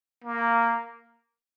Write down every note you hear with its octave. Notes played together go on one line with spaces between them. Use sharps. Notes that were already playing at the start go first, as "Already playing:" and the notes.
A#3